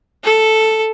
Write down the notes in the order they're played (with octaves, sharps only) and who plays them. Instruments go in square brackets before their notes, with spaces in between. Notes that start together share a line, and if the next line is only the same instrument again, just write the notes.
[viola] A4